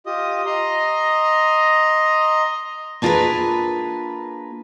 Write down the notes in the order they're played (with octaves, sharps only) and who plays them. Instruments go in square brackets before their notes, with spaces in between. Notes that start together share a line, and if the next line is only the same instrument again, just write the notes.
[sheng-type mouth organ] F4 G4 D#5 D#6
D#5 A#5 C6
[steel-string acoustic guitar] A#3 D4 F4 G#4 A#4 B4